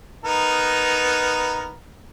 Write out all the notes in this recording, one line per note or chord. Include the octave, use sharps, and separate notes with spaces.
B3 D#4 A#4